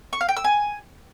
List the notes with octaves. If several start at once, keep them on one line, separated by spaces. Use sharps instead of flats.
C#6
F5
G5
E6
G#5